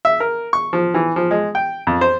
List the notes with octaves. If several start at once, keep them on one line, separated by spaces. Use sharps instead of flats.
E5
A#4
C#6
F3
E3
F3
G#3
G5
F2
C5